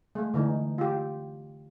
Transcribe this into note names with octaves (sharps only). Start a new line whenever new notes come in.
G#3 A3
D3 E3 A3 D#4
F4 G4